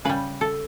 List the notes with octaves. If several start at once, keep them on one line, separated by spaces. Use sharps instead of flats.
C#3 G3 B4
A4